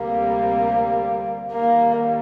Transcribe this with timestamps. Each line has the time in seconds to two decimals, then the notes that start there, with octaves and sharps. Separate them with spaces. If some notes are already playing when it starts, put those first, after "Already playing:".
Already playing: D2 C3 G3 A#3
1.51 D#2 D#3 G3 A#3